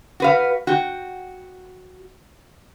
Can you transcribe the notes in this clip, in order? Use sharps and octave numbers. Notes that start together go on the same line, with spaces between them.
F#4 B4 F5
F#4 G5